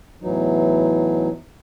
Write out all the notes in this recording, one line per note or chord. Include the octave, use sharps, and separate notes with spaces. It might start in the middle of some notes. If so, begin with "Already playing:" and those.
E2 A2 E3 F#3 D#4